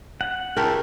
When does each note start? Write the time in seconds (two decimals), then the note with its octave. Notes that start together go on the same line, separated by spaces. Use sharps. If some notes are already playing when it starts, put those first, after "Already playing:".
0.21 F#5
0.57 C#2 A3 G4 A#4 A5